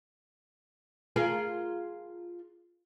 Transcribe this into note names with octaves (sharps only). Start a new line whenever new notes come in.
F4 G#4 A#4